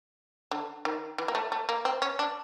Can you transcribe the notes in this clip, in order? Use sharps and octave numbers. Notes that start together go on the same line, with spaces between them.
D3
D#3
E3
A#3
A3
A3
A#3
C4
C#4
D4